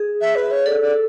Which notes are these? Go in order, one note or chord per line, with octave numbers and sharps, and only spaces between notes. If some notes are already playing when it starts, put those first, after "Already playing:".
Already playing: G#4
E5
B4
C#5
A4 D5
D5